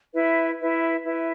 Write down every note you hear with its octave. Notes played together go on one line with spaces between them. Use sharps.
E4 B4 E5
E4 B4 E5
E4 B4 E5